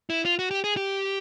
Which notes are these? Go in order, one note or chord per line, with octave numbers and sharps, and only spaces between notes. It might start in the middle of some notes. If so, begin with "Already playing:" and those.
E4
F4
F#4
G4
G#4
G4